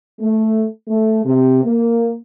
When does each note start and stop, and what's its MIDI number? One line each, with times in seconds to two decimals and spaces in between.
0.21 0.66 57
0.89 1.25 57
1.26 1.64 48
1.64 2.14 58